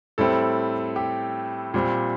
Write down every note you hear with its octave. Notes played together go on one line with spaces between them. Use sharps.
A2 G3 C4 A4
G4
A#2 G3 C4